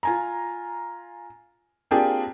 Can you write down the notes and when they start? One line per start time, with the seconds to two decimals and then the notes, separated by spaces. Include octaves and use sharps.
0.03 F4 G#5 A#5
1.91 A#3 C4 D4 F4 G4 G#4